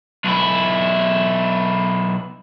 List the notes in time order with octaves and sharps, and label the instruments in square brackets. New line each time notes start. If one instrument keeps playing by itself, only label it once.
[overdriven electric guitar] B1 E4